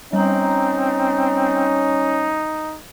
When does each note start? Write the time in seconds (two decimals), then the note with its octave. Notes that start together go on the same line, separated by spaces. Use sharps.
0.13 G3 C4 C#4 D#4 A#5